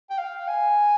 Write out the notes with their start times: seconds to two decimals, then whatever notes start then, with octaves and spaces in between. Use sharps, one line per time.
0.10 G5
0.18 F5
0.48 G#5